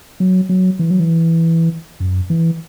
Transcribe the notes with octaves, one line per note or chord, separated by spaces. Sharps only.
F#3
F#3
E3
F#3
E3
F#2
E3